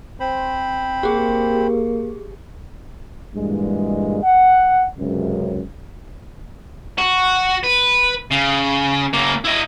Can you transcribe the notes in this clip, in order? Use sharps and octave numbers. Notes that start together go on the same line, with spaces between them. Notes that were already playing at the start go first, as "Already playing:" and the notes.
C4 C5 B5
A#3 G4 G#4
G2 A#2 E3 G#3
F#5
C#2 F#2 C3
F#4
B4
C#3
C#3 A#3
E4 D#5